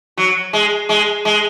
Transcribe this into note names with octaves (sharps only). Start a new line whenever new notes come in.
F#3
G#3
G#3
G#3